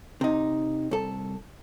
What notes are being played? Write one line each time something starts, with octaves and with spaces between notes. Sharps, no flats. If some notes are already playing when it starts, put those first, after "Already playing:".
C3 D#4
C2 A4